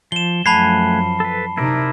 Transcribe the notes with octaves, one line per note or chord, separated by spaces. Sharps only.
F3 E7 G7
F#2 F3 A3 F#5 G#5 A5 B5 C7
A4 B4
C3 D#4 E4 A#4 D5